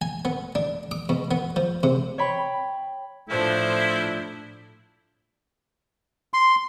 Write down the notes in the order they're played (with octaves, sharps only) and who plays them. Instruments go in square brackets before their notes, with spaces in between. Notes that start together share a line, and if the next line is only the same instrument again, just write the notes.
[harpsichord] G#5
B3
D4
D6
B2
B3
F3
C3
[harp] C#5 G5 B5
[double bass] A2 [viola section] F3 D4 C5 [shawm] E4
[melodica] C6